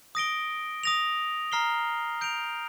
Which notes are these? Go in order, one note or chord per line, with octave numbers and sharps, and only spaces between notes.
D#6 A#6 D7 G7
D#6 A#6 F7
A#5 F6 C7 G7
G6 D7 F7